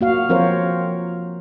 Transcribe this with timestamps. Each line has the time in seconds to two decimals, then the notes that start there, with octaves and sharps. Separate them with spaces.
0.01 A#3 F#4 F5
0.29 F3 C4 F4 A#4 C5 C#5